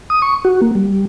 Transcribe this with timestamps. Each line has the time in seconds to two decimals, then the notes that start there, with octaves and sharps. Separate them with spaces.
0.10 D#6
0.22 C#6
0.45 F#4
0.62 A#3
0.75 G3